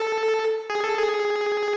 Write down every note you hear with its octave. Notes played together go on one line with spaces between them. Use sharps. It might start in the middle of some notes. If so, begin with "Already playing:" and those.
Already playing: A4
G#4
A4
G#4